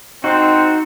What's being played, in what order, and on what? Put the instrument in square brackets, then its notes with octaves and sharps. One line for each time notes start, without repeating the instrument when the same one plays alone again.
[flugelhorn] C4 [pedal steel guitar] D#4 F#4